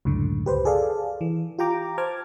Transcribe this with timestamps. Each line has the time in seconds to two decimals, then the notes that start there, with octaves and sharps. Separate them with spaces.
0.05 C#2 F#2 A2 D3
0.46 G4 B4 C5
0.65 G#4 A4 D5 F5
1.21 E3
1.59 F4 G4 G5 A#5 D6
1.98 C5 A5 D6 F6 G#6